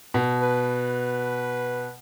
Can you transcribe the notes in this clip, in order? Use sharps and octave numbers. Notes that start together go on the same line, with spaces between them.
B2
B4